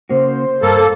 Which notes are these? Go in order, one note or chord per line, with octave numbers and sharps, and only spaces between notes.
C#3 A#3 F#4 C5
G2 A#3 A4